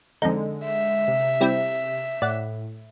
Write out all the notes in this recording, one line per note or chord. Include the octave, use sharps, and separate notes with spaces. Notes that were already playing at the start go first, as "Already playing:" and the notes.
F2 D3 G#3 D#4
E5
C3
G3 C4 E4
A2 D5 F#5